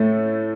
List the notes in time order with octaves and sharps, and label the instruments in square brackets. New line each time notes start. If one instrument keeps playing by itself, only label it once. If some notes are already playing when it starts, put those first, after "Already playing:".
Already playing: [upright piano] A2 A3